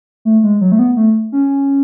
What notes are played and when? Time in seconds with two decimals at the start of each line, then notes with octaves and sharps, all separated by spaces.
0.25 A3
0.44 G#3
0.61 F#3
0.72 A3
0.79 B3
0.97 A3
1.32 C#4